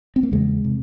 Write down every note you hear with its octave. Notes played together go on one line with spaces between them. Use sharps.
C4
A#3
E2 C#3 G#3
C3